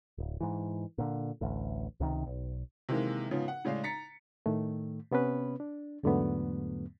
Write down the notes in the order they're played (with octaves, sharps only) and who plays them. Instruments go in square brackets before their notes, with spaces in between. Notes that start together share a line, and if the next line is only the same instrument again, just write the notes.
[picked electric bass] D1
G#2 E3
A#2 D3
A1 D2
C#2 C3 D#3
B1
[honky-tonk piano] C3 D#3 E3 G#3 A#3
G#2 C#3 F3 B3
F#5
A2 C#3 G#3 D5 F5
A#5 A6 B6 C#7
[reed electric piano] A2 D#3 A3
C3 B3 C#4 B4
D4
E2 G#2 D3 F#3 A3 B3